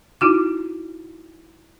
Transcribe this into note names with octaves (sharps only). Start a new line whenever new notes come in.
D#4 E4 F#4 D6